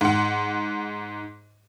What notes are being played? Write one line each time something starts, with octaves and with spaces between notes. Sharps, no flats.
G#2 F#5